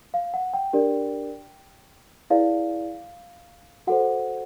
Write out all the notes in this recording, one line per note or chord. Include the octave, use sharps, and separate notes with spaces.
F5
F#5
G5
D4 G4 A#4 D5
E4 G#4 B4 D5 F5
F#4 A4 C5 F#5